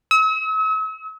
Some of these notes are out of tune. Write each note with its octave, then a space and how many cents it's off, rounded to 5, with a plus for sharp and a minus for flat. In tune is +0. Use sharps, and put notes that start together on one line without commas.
E6 -45